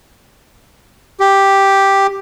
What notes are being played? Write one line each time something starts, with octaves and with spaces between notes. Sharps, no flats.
G4